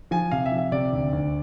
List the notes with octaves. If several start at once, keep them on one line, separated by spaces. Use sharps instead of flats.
F3 G#5
C3 F5
E5
F3
E5
C3 D5
D2
D2